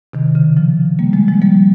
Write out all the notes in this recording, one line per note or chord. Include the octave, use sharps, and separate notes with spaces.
C3 D#3
C#3
C#3 F3
G3 A#3
F3 G#3
F3 G#3
G3 A#3